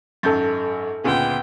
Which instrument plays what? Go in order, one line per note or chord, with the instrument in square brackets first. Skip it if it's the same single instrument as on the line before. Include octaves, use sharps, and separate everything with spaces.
[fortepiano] G#1 F#2 [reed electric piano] A4 G6 A6
[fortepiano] D2 A#2 C#3 [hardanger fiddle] B3 G5